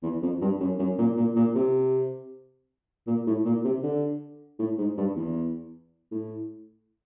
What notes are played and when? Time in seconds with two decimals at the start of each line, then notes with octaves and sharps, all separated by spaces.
0.03 E2
0.22 F2
0.41 G2
0.60 F#2
0.79 F#2
0.98 A#2
1.17 A#2
1.36 A#2
1.55 C3
3.07 A#2
3.27 A2
3.45 A#2
3.64 C3
3.83 D3
4.59 A2
4.78 G#2
4.98 G2
5.16 E2
6.12 A2